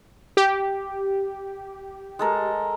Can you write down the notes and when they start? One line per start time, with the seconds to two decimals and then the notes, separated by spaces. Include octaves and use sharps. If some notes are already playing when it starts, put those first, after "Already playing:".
0.37 G4
2.19 G#3 A4 A#4